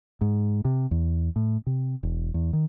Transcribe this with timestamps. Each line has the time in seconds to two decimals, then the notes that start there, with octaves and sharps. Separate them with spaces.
0.21 G#2
0.65 C3
0.91 E2
1.36 A2
1.67 C3
2.03 E1
2.34 E2
2.53 D#3